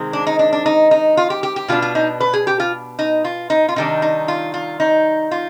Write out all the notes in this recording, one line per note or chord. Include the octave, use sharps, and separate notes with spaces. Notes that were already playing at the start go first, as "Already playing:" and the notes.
Already playing: C3 D#3 G#3 C4
D4
D#4
D4
D4
D#4
D#4
F4
G4
G4
G4
B2 B3 D4 F4
F4
D#4
B4
G#4
G4
F4
D#4
F4
D#4
F4
C3 D#3 G3 D4 D#4
D#4
F4
F4
D#4
F4